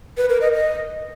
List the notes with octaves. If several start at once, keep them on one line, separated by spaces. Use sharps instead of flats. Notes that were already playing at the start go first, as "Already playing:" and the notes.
B4
A#4
D#5
D#5